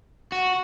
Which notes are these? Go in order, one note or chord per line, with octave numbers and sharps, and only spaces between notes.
F#4